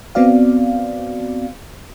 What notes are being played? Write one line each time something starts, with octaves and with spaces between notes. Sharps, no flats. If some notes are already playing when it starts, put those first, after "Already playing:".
B3 C4 F#4 D5 F5